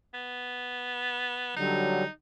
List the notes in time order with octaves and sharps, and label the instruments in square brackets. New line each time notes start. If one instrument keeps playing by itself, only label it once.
[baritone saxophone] B3
[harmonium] D3 F#3 G3 [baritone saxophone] D#4